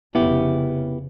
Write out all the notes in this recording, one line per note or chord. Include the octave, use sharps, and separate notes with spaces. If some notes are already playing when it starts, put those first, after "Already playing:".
F1 C#3 B3 E4 G4